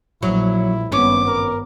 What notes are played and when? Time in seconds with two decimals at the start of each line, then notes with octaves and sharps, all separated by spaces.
0.23 A#1 F#3 E4
0.92 G#1 G2 B3 C#4 D6
1.27 A#4